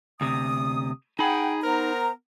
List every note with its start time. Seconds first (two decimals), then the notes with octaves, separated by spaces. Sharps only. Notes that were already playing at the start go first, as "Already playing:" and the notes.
0.21 D2 C3 D#6
1.19 D#4 G#4 F#5 G5 B5
1.63 B3 A#4 C5 A#5